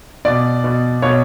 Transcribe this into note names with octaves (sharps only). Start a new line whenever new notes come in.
B2 D5
B2
B2 C#5